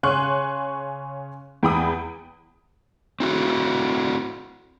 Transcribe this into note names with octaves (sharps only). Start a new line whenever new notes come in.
C#3 C#5 G#5 C6 C#6 F#6
E2 G5 B5 D#6
C4 E4 F#4